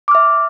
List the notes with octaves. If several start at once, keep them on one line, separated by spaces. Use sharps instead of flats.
E5 D6 F6